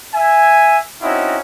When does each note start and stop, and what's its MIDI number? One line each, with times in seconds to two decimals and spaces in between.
0.14 0.79 76
0.14 0.79 80
1.02 1.38 60
1.02 1.38 61
1.02 1.38 63
1.02 1.38 64
1.02 1.38 66